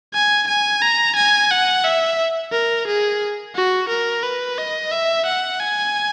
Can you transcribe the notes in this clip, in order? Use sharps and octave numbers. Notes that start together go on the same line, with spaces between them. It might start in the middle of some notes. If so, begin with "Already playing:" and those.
G#5
G#5
A#5
G#5
F#5
E5
A#4
G#4
F#4
A#4
B4
D#5
E5
F#5
G#5